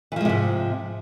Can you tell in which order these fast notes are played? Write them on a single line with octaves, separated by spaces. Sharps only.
E3 F3 G#3 C3 G#2